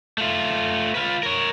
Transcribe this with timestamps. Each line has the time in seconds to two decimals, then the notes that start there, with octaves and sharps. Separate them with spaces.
0.18 A3 F4
0.95 F4 B4
1.23 A#4 C#5